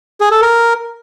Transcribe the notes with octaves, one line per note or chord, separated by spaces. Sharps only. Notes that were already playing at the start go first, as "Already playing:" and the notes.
G#4
A4
A#4